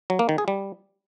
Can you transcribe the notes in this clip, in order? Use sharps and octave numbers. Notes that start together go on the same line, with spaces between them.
F#3
A#3
D#3
G#4
G3